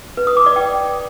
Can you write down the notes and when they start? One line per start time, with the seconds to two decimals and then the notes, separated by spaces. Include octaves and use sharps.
0.17 B4
0.27 D#6
0.37 D6
0.46 D5
0.56 G5